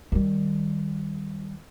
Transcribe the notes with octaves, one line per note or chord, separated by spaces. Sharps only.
D#3 G3